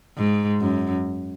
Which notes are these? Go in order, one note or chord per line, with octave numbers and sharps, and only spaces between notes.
G#2
F#2